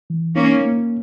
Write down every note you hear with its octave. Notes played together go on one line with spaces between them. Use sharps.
E3
A#3 C#4 D#4
A#3